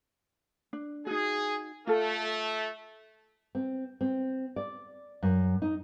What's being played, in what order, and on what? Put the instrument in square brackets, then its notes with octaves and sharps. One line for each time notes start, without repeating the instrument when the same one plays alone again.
[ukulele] D4
[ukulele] D#4 F#4 [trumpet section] G#4
[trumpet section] A3 [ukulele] F4 A4
[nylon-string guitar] C4
C4
D5
F#2
D#4